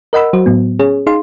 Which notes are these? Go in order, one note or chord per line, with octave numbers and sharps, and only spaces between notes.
A#4 D#5 F#5 B5 E6
F#3 F#4 C5
A2 F#3 B3
C#4 G#4 C#5
D#4 G#4 F5 C6